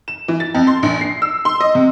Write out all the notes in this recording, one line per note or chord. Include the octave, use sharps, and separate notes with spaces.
E7
E3
A6
F2
C6
A#1
C7
E6
C6
D#5
C3